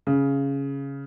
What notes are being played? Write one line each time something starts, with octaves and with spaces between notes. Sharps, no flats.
C#3